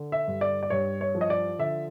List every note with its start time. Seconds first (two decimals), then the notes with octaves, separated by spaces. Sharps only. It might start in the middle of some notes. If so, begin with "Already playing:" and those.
Already playing: D3
0.12 E5
0.28 G2
0.41 D5
0.63 D5
0.70 G2 C#5
1.01 C#5
1.15 F3
1.21 D#5
1.30 D5
1.59 D3 E5